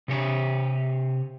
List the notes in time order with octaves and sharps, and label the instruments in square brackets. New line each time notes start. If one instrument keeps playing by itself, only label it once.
[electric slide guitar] C3 G4 C#5